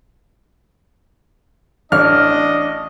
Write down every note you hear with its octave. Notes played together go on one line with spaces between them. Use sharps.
A1 D4 D#5 F6